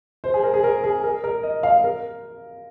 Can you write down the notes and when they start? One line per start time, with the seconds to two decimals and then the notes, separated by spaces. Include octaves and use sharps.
0.24 C5
0.34 G#4
0.44 A#4
0.54 G#4
0.64 A#4
0.84 G#4
1.04 A#4
1.24 A#4
1.43 D#5
1.63 F5
1.84 A#4